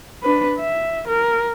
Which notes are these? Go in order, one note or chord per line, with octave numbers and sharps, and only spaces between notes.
D4 B4
E5
A#4